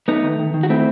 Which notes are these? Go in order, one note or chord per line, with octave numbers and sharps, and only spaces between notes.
A3 B3 D#4
D#3
D#3
D#3
F#4
A3 C4 E4